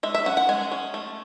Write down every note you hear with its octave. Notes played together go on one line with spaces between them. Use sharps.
G#3 E5
E5
C#4 F#5
F#5
G#3 G#5
C#4
A3